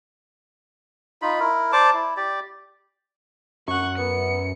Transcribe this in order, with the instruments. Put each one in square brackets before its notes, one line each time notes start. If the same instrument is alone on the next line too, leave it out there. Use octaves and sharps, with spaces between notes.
[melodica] D#4 F4 B5
E4 A#4
C5 D5 A5 D6
E4
G4 D5
[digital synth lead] F#2 [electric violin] F#5 C#6
[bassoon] B3 [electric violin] C#7